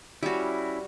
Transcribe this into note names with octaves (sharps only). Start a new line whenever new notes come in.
G3 C#4 E4 F#4